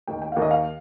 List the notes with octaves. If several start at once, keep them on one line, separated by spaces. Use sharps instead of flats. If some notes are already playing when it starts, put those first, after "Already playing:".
D#2 D#3 G5
G5
D#2 D#3 F5
D#5
F5